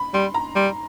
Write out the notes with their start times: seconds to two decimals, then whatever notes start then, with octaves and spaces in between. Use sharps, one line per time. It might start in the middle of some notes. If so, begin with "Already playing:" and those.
Already playing: B5
0.14 G3 C6
0.34 A#5
0.55 G3 C6